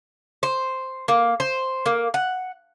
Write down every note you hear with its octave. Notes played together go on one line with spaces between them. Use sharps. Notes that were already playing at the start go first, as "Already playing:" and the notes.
C5
A#3
C5
A#3
F#5